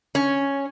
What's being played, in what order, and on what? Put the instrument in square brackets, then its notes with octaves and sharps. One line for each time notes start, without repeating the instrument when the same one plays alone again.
[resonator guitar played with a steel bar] C#4